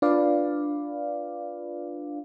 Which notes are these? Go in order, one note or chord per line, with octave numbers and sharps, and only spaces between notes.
D4 F4 B4 D5 F5